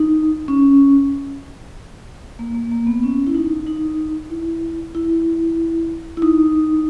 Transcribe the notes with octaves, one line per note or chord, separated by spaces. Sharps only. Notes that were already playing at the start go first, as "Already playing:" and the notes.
Already playing: D#4
C#4
A#3
A#3
A#3
B3
C#4
E4
D#4
D#4
E4
E4
E4
D#4